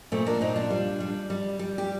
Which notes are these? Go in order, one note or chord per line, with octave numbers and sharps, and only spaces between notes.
A#2 A3 C4
A#3 D4
A#2 C4 D#4
D4 F4
G3
G3
G3
G3
G4